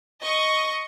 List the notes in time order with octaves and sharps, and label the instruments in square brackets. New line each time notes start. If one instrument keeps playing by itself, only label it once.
[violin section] D#5 C#6